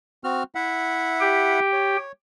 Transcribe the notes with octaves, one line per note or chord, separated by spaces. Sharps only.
C4 F#4 F6
E4 E5 F#5
G4 G5
C#5